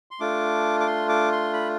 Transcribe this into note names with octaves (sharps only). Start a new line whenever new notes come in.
C6
A3 D4 F4 D6
D6
C6
D6
C6
B5